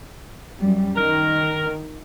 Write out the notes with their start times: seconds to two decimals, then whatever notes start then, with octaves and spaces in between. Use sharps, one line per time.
0.59 F#2 G3
0.96 D#3 A#4